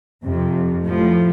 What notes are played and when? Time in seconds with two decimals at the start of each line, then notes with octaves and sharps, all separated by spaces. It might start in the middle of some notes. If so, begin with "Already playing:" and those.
0.24 F2 C3 F3
0.84 A2 F3 A3